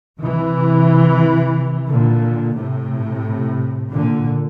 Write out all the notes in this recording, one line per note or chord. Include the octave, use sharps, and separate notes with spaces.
C3 E3
A#2 D3
A2 C3
A#2 D3